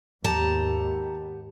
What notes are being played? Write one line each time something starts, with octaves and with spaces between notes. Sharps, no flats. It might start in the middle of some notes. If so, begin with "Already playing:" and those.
D#2 G#2 B3 G4 A5 A#5